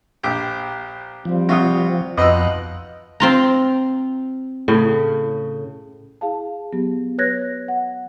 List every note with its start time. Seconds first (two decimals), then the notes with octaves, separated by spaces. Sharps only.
0.24 A#1 G4
1.25 F3 G3 C4
1.49 C3 F4 F#4 D#6
2.18 F2 B2 D#4 F4 D#5 E6 F#6
3.20 C4 F4 A#5
4.68 A2 C#3
6.21 E4 G#4 F5 A5
6.73 F#3 B3 G4
7.18 B4 C#5 F#6 G#6 A#6
7.68 F#5